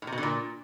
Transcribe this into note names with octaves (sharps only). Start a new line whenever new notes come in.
A2
C3
B2
D3
A#2